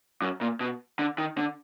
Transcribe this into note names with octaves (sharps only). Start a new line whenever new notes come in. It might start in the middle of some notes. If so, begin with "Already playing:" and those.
F#2
A#2
B2
D3
D#3
D3